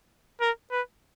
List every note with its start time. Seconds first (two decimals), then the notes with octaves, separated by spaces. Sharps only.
0.41 A#4
0.72 B4